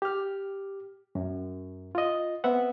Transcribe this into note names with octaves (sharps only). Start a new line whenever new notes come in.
G4 F6
F#2
F4 D#5
B3 C4 E5 F#5